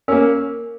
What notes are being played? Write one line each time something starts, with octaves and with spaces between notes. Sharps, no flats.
A#3 C#4 A#4